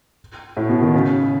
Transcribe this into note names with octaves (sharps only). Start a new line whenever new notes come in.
A2
B2
D#3
C#3